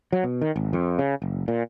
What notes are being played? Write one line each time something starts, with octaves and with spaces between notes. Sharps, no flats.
F#3
B2
D#3
G#1
F2
C#3
F#1
A#2